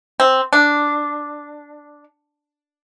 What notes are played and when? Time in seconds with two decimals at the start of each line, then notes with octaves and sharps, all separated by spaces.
0.20 C4
0.53 D4